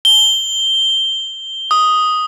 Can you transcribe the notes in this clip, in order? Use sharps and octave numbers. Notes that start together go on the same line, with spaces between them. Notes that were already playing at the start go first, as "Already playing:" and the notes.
G7
D#6